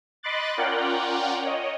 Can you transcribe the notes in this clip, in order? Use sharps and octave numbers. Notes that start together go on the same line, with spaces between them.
D#5 B5 C6 D6 F#6 A6
C#4 F4 A#4 D5 F#5 G5
C#5 D#5